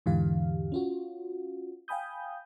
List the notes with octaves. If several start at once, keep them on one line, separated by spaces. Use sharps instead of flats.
E2 G#2 D3 E3 G4 F5
C#4 F4 F#4
F5 G5 G#5 B5 D#6 G6